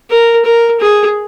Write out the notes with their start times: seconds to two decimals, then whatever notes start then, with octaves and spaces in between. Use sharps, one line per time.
0.10 A#4
0.45 A#4
0.80 G#4